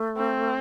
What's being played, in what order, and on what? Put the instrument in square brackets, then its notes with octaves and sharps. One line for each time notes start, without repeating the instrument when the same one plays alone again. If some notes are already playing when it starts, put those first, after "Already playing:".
Already playing: [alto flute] A3
[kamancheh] C4